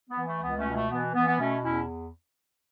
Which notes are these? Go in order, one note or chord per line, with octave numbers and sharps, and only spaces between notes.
B3
E3
A3
C#2 B3
A3 C#4
B2
A3
E3 B3
E3 B3
B3
B2 A3 C#4
E2 C#4 E4